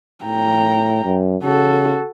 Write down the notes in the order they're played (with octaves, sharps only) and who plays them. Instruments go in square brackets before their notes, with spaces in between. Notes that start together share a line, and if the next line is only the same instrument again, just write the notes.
[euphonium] A2 [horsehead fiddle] G5 A#5
[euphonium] F#2
[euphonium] C#3 [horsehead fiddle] F#4 A4